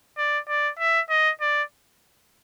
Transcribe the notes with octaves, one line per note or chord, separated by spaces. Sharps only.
D5
D5
E5
D#5
D5